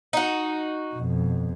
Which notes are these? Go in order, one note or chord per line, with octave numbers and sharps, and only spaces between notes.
D#4 F#4
F2 B2